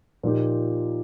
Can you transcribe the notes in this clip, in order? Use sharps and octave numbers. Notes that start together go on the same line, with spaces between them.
A#2 F3 A#3 D#4 G4